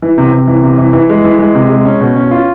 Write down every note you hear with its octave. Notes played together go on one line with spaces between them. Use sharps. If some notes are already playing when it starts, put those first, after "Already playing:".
E3
C3
C3
E3
C3
E3
E3
G#3
E3
G#3
C3
G#3
C#4
B2
C#4
F4